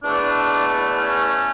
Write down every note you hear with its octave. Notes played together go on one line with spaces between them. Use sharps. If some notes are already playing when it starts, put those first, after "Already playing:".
E2 B2 A3 D4
C#4